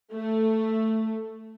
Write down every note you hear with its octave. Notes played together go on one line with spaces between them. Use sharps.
A3